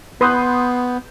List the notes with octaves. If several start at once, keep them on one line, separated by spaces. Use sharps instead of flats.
B3 B4 C6 D#6 G6